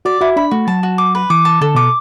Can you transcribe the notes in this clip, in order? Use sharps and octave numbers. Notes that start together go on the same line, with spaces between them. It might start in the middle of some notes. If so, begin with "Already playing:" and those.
F#4 D5
E4 F#4
D4 B5
A3 F#4
F#3 A5
F#4
D6
B4
E3 D6
A5
D3 A4
B2 D6